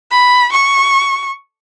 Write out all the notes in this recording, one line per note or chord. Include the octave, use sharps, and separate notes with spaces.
B5
C#6